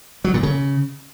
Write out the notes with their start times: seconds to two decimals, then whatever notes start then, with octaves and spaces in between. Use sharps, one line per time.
0.24 F#3
0.34 A#2
0.43 C#3